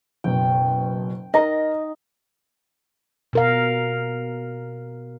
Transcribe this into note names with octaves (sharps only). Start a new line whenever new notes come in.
F#1 B2 G5
D#4 A#4 D#5 A#5
B2 A#4 F5